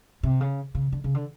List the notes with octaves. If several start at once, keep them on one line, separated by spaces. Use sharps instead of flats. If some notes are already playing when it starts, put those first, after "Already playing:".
C3
C#3
C#3
D3
C#3
D3